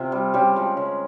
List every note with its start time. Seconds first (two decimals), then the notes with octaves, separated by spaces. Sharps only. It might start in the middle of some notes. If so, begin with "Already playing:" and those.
Already playing: C3 F4
0.12 G3
0.34 C#3 G3 G4
0.56 F3 G#3
0.77 C#3